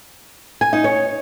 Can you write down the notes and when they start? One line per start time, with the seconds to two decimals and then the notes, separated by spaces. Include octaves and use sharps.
0.61 G#5
0.73 D#4
0.84 C#5